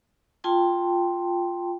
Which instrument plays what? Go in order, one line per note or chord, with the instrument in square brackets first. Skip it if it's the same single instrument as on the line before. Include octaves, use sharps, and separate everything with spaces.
[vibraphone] F4 G5 A5 C6